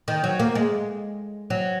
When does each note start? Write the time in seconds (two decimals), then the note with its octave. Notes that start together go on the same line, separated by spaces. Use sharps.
0.08 D#3
0.24 F#3
0.40 A#3
0.55 G#3
1.50 F#3